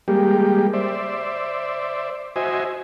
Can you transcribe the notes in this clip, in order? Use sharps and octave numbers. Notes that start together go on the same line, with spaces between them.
G3 G#3 A#3 G4
C5 D5 E5
F#4 C5 D#5 E5 G#5